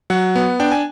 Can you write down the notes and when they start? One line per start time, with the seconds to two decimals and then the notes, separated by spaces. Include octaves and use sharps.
0.10 F#3 F#5
0.35 B3
0.60 D4 G5
0.72 G#5